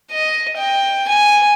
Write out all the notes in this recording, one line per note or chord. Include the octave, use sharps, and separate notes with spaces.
D#5
G5
G#5